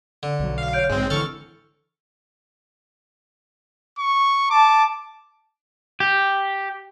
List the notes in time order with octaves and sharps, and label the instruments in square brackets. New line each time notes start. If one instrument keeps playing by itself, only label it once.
[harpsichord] D3
[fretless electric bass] B1 F#3
[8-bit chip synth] F5
[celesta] C#5 G6 D7
[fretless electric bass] A#1 G#2 [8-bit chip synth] G#3 C4
[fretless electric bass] D3 E3 [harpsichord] A4 [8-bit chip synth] C#6 F6
[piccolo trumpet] C#6
[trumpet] A5 [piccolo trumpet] D6
[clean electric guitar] G4